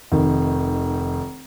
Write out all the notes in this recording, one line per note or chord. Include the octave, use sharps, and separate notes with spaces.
F1 D#3